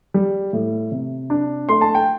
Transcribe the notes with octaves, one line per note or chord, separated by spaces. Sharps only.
G3
A2
C3
D4
A3 C6
A5
G5